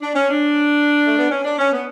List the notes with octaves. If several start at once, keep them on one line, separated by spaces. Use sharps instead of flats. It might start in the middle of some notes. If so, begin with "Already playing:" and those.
D4
C#4
D4
A3
B3
C#4
D4
C#4
B3